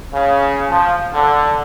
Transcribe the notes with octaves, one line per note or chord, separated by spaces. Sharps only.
C#3
F3
D3